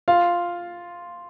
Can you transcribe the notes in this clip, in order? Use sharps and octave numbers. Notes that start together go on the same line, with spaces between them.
F4 F5